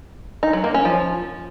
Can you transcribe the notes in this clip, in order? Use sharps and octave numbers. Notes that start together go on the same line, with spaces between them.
D#4
F#3
A#3
C#4
F3